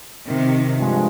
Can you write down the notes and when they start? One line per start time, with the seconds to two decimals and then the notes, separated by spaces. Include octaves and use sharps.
0.28 C3 D#3
0.75 G2 F3 G#3